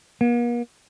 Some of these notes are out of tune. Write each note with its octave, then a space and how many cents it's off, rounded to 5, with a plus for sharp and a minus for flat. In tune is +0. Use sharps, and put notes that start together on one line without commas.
A#3 +45